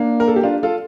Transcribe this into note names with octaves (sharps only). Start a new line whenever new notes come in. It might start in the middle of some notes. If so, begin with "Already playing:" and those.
Already playing: A#3 D4
A#4
A4
G4
D4 F4
F4 A4